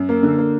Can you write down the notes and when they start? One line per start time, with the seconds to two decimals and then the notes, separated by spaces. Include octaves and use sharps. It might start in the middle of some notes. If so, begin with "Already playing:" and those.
Already playing: F#2
0.09 A#3
0.23 D3
0.38 A#3